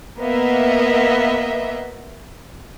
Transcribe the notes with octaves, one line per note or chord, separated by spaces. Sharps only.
A#3 B3 D#5 E5